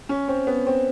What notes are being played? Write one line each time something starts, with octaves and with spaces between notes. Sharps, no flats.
C#4
C4
B3
C4